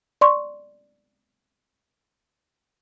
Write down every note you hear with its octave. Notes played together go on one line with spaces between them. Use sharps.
D5 C6 C#6